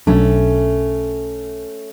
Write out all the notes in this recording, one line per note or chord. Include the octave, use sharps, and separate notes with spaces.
B1 F#3 A3 C#4 D4